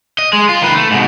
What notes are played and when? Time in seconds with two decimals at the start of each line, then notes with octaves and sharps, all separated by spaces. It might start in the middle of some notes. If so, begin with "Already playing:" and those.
0.19 D#5
0.33 G#3
0.49 F4
0.62 D#3 B4
0.74 A3
0.91 G#2 B2